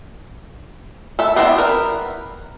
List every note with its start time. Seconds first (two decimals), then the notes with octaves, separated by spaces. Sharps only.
1.19 A4 E5
1.36 B3 C4 D4 E4
1.58 A#4 B4